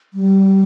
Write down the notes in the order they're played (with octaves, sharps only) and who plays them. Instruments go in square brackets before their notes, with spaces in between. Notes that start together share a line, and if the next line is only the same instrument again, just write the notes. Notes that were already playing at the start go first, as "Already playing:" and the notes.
[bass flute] G3